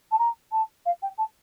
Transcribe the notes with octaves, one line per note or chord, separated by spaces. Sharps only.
A5
A#5
A5
F5
G5
A5